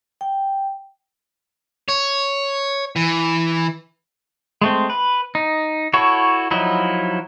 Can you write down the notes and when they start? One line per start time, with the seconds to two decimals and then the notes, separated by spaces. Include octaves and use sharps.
0.21 G5
1.89 C#5
2.96 E3
4.62 G#3 A3 C4
4.90 B4
5.35 D#4
5.93 E4 F#4 A4 C#5
6.51 F3 F#3 D#4 E4